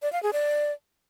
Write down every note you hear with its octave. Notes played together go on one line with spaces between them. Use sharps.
D5
F5
G#4
D5